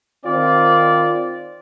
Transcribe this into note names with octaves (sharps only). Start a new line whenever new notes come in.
D#3 C4 F4 D5